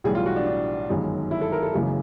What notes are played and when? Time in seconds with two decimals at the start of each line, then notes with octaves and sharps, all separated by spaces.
0.04 B1 A2 E3 G3 G#4
0.15 F4
0.26 F#4
0.36 D4
0.46 D4
0.89 G1 F#2 D#3 G#3
1.31 E4
1.41 A4
1.52 A#4
1.63 A4
1.74 F#1 F#2 C#3 E3 G#3